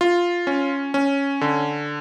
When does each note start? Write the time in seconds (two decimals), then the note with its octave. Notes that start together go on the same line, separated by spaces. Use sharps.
0.01 F4
0.47 C#4
0.94 C#4
1.41 D3